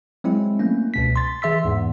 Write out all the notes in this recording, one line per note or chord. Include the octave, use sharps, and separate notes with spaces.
F#3 G#3 C4 E4
A3 A#3 C#4
C#2 B2 B6
C6 A6
E3 G#4 E5 C6 E6 B6
E2 G#2 E3